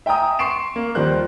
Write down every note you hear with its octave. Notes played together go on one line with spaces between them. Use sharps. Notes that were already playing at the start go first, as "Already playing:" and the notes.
E5 G5 G#5 A#5 D#6
C6 C#6 C7 D7 E7
A#3
D#2 D#3 F3 G3 C5 F#6